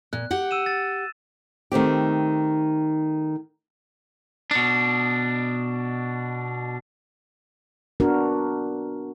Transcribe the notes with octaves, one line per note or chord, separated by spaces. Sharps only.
A#2 F#6
G4 F#5
E6 D#7 E7
A6
D#3 A3 C4 G4
B2 D4
B3 D4 F#4 A#4